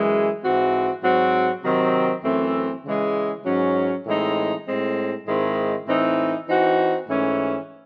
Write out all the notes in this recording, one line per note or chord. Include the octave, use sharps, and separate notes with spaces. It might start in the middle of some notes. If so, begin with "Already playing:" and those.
Already playing: F#2 E3 G#3
G#2 E3 C4 F#4
G#2 F#3 C4 F#4
C3 D#3 F#3 C4
F#2 E3 A3 C4
C#3 E3 G#3
G#2 F#3 C#4
A2 E3 G#3 C4 D#4
A2 G#3 C4
G#2 D#3 G#3 C4 E4
A2 E3 C4 D#4
E3 C4 D#4 F#4
G#2 E3 A3 C#4